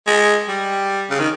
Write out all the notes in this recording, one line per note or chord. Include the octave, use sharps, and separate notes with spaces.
G#3
G3
C#3
D#3